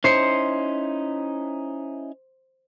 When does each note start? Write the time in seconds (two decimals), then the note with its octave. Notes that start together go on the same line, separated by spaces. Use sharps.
0.04 C#4 D#4 E4 C5 C7 C#7